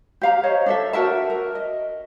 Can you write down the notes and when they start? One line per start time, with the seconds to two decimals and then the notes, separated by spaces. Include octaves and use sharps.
0.22 G4 F5 A#5
0.43 C5 C#5 D#5
0.66 D4 A4 E5
0.93 F#4 A#4 E5 A5
1.30 A#4
1.55 D#5